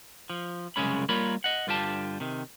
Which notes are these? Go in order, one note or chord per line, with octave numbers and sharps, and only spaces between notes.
F3
C2 F#2 C#3 G#3 C#4 B5
G3 A#3 F4 A#4 C#5 B5
D#5 F#5
G2 D3 F4 G4 A5
C3 D#3